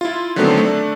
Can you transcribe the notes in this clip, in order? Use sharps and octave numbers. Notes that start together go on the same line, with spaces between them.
E4 F4
D3 D#3 F#3 A3 B3 C4
A3 D4